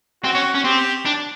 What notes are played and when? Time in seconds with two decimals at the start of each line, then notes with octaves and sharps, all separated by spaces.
0.24 C4 F#4
0.35 C#4
0.55 C#4
0.65 C4 G4
1.06 D4